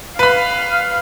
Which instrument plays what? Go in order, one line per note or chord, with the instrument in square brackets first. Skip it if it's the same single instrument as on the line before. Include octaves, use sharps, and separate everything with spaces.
[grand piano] B4 B5 [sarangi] F5